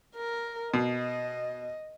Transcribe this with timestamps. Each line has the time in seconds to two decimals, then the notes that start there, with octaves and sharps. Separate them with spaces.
0.16 A#4
0.74 B2 D#5